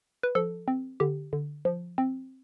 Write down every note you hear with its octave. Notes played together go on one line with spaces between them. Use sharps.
B4
F3 A4
C4
D3 G4
D3
F3
C4